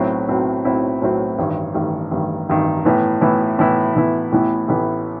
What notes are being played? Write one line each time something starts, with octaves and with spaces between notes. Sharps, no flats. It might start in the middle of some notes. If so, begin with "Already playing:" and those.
Already playing: B1 A2 F#3 C4 E4
B1 A2 F#3 C4 E4
B1 A2 F#3 C4 E4
B1 A2 F#3 C4 E4
A1 G2 D#3
A1 G2 D#3
A1 G2 D#3
A1 G2 D#3
A2 E3 B3 E4
A2 E3 B3 E4
A2 E3 B3 E4
A2 E3 B3 E4
A1 A2 E3 B3 E4
A1 A2 E3 B3 E4